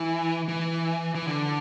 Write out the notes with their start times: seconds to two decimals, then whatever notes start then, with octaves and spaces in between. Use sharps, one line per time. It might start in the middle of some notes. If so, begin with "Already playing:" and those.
Already playing: E3
0.48 E3
1.15 E3
1.27 D3